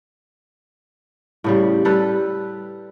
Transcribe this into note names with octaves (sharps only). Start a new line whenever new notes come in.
A2 C#3 G3
G3 A4 B4